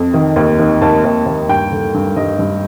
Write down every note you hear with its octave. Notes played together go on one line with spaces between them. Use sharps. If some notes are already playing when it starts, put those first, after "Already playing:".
Already playing: F2
D#3
D#2
D#3
D#2 A5
D#2
D#2
G2 G5
D3
G2
G2 D#5
G2